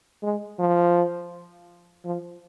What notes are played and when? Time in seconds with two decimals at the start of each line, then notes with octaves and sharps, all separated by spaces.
0.23 G#3
0.59 F3
2.05 F3